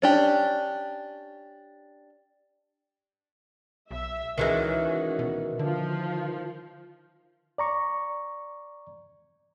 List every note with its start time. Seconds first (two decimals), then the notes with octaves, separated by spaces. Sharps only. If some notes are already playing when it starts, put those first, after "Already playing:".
0.02 C#4 D4 G4
3.91 B1 E5
4.38 C#2 D#3 E3 G#3 C#4 F#4
5.19 B2
5.59 D3 F3 F4
7.58 D5 A#5 C#6